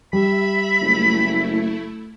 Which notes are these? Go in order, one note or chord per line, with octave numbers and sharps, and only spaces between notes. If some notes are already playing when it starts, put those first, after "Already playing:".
G3 E5 B5
F#1 A3 E4